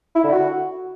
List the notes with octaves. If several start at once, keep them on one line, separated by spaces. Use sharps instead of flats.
E4
D3
F#4